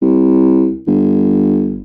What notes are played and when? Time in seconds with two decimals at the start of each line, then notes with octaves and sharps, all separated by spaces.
0.02 C2
0.87 G1